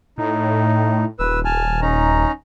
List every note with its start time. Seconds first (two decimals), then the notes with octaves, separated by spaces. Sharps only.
0.18 A2 D#4
1.19 D#1 B4 E6
1.45 G#5 A5 F6
1.82 C#4 D#4 A#5